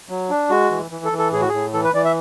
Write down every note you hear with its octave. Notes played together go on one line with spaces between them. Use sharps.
F#3
D4
G#3 F#4
E3
E3
A4
E3
A4
A2 G#4
F#4
A2 G#4
E3 A4
B4
E3 D5
E5